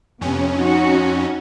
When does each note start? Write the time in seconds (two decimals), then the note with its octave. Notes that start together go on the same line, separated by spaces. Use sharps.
0.21 F2 C3 B3 C#4
0.57 D#4 F#4